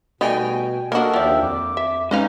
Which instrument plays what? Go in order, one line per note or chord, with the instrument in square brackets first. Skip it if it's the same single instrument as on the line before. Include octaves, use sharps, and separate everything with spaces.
[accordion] B2 [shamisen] G3 A3 D#4 [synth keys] F#4 G5 G#5
[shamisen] A#3 F#4 [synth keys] D4 A#4 [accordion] A4 D#5
[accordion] D#2 E5 G5 [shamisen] F3 D5
[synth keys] F2 [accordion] D6
[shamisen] E5
[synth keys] G#3 C#4 D#4 [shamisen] B4 D#5 F5